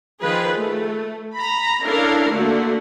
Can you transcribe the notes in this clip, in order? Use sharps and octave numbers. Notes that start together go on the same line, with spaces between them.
D#3 F3 F4 G#4 B4
A3
A#5 B5
C#4 D4 E4 A4 A#4 F5
D3 A3 A#3 F#4